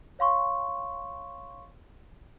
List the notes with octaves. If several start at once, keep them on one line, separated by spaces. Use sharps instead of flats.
C#5 F5 C6 C#6